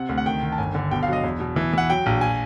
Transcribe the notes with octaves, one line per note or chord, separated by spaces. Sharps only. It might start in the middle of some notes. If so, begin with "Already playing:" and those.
Already playing: C3 F#5
D2
F#5
D#3 G5
D#3
A5
G1 G#5
D3
B2 G5
F5
F#3
D#5
E2
B2
E3
E3 F#5
F#3 G5
A#1
G#5